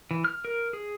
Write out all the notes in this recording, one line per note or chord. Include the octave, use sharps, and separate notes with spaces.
E3
F6
A#4
G#4